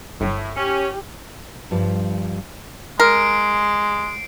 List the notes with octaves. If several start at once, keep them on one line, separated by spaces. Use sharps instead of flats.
G1 A2
C#4 G4
G2 F3 G3
G#3 A#4 C7 D7